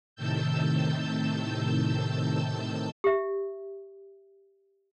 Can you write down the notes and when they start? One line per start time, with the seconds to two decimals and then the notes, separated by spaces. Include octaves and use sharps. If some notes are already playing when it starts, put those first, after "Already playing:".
0.16 A2 C3 D#3 A5 E6 G6
3.04 G4 E5